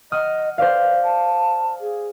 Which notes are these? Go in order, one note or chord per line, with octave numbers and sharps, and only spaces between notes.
D#5 F#5 D#6 F6
B4 C5 D5 F5
A5
G#4